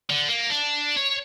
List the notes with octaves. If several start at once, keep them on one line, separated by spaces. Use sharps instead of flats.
D3
A#3
D4
C#5